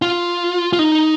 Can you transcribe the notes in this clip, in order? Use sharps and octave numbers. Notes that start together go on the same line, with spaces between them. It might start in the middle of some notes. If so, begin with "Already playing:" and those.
F4
F4
D#4